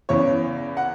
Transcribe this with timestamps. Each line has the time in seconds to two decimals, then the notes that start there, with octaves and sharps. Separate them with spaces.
0.09 E2 C#3 E3 C#5
0.77 F#5